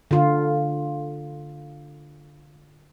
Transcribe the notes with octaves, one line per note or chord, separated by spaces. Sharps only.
D3 F4